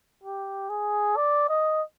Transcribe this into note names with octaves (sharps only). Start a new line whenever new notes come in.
G4
G#4
D5
D#5